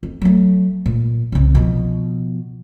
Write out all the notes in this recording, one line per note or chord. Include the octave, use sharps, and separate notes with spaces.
F2
F#3 A3
A#2
C2 C#3
B2 F3